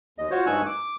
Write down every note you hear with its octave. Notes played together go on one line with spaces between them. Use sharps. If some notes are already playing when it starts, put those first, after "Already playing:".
D#2 D#5
F4 F#4 C5 C#5
G2 D#4 G#5 C#6 E6 F#6
D6